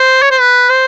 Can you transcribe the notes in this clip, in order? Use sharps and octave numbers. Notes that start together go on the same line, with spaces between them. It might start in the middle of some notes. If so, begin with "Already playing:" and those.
Already playing: C5
C#5
C5
B4
C5